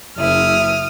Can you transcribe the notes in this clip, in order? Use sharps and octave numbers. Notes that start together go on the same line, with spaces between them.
F#1 E4 D#6 F6